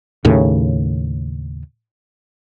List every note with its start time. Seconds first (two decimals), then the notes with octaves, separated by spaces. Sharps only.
0.25 D#2 A2 C#3